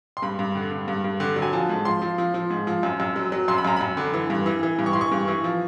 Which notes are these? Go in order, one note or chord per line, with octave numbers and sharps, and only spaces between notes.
C6
G2 B5
G2
D3
G2
G2
G2
D3
F#3
G#5
F3 A5
G#2
F3 C6
F3
F3
F3
G#2
F3
F#2
F#2
F#3
F#3
F#2 C6
B5
F#2 A#5
F#2 B5
D3
E3
G2
E3
E3
G2
C#6
E3 C6
C#6
G2
E3
F3